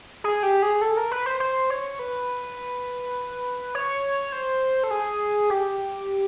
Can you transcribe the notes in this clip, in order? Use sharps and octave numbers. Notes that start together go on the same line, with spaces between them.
G#4
G4
G#4
A4
A#4
B4
C5
C5
C#5
B4
C#5
C5
A4
G#4
G4